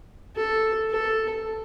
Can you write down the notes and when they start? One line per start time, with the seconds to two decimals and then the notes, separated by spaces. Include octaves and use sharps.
0.36 A4
0.91 A4